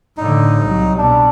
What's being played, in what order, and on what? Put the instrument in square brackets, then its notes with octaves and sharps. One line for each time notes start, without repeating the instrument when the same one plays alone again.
[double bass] A2 D3 [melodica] D#4
[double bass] C2 F#3
[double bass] B2 [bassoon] D4